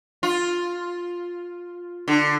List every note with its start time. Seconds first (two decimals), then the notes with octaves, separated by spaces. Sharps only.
0.23 F4
2.08 D3